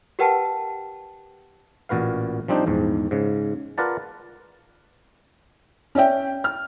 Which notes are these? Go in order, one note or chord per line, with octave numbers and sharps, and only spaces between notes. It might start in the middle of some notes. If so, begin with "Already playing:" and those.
G4 A#4 B4 F#5 G5 A5
A1 A#2 F#4 B4 F5
F3 G3 C4 D4 D#4 C5
A#1 E2 G#2
G#2 C#3
F4 A#4 B4 D5 F#5 A5
C#4 D5 E5 G5
F6